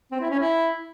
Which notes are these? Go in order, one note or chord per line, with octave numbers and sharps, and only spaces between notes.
C4
E4
C#4
E4